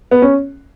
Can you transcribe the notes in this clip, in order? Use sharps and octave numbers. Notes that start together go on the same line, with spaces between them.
B3
C#4